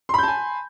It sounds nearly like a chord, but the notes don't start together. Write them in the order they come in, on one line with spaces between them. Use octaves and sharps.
C6 B5 G6 A5 G#5